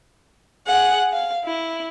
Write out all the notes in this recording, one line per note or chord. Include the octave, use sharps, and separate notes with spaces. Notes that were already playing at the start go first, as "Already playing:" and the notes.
G#4 F#5
F5
E4